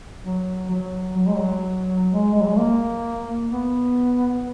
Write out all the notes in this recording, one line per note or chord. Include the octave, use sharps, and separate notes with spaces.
F#3
F#3
F#3
G#3
F#3
G#3
G#3
F#3
G#3
A#3
B3